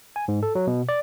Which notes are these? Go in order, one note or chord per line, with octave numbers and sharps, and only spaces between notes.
G#5
G#2
A4
F#3
B2
D5